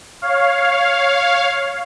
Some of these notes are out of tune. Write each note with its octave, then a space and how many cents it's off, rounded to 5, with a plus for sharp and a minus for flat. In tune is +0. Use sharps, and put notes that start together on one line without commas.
C#5 +0 F5 +5